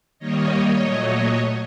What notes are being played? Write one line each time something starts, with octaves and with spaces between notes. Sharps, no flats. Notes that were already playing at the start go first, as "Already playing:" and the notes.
D#3 G3 A#3 C#5 D#5
A#2 F#3 A3